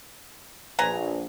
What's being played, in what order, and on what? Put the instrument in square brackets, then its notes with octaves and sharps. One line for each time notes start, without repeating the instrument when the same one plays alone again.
[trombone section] A#1 [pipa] B4 G#5 A#5